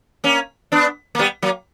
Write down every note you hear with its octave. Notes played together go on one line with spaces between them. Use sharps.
A#3 C#4
B3 D4
A#3
G3 B3
F#3 A#3